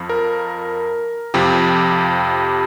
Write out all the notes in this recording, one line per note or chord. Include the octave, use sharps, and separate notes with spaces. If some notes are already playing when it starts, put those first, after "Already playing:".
Already playing: F2 F3
A#4
F2 C3 F3 G4